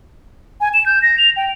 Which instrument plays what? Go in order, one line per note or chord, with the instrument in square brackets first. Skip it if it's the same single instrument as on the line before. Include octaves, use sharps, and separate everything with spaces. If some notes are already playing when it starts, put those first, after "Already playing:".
[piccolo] G#5
E7
G6
A#6
F7
G5